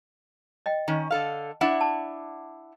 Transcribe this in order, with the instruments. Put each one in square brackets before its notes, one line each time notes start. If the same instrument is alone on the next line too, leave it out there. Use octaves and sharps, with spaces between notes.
[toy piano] D#5 G5
[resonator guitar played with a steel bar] D#3 C#4
D3 A4 F5
D4 E4 F#5
[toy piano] A5